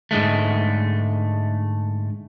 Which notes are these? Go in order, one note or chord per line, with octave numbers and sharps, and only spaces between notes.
G#2 D3 G#3 A3